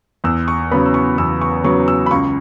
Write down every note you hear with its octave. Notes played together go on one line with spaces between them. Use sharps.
E2 E6
C#6
C#3 F#3 B3 B5
E6
C#6
E2 E6
C#6
C#3 F#3 B3 C#6
E6
B5
C#2 C#6